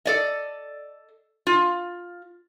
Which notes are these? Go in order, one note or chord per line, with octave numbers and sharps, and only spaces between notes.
A4 D5 D#5
F4